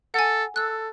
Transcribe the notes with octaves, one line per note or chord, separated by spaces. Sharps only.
A4 F#5 G#5
A4 E6 F#6